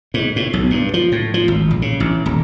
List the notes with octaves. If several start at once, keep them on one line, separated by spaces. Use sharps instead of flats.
G#2
A2
B1
G2
F3
A2
F3
G#1
A#1
C#3
A1
D#1